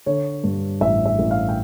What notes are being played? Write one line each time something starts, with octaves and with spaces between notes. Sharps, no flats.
D3 C#5
G2
A1 E5
E5
A1
F5
G5